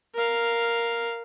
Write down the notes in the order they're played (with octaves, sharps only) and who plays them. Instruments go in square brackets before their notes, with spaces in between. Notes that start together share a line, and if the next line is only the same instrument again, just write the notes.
[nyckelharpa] A#4 F5